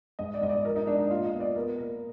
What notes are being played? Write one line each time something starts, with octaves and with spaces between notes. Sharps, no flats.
G#2 D#5
D5
G#2 D#5
D5
F3 A#4
D#4
G#3 D4
D#4
A#2 F4
D#5
B3
D5
B3 A#4
A#2 A#4